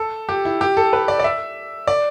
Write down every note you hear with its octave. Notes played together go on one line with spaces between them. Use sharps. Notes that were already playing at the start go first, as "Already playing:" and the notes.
Already playing: A4
G4
E4
G4
A4
B4
D5
D5
E5
D5